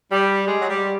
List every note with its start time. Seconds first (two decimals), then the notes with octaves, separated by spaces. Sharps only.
0.12 G3
0.46 G#3
0.61 F#3
0.69 G3